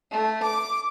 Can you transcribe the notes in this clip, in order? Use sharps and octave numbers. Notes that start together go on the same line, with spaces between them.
A3
D6